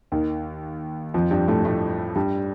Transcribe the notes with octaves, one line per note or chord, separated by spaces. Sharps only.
D#2 D#3
F2 F3
G2 G3
A2 A3
A2 A3
G2 G3